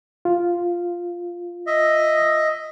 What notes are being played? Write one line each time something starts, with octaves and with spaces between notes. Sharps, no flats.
F4
D#5 E5